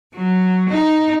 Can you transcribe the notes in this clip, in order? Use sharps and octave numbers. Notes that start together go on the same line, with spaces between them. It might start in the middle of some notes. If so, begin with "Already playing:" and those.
F#3
D#4